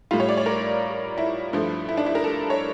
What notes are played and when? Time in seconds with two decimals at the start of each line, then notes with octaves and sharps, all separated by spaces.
0.11 A2 G3 F4
0.20 C#5
0.29 D5
0.37 C#5
0.46 A#4
1.18 E4
1.53 G2 F3 A3
1.89 E4
1.97 D4
2.06 E4
2.15 A#4
2.24 A4
2.50 C#5